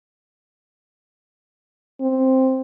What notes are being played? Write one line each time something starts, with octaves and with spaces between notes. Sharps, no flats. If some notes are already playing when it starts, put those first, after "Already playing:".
C4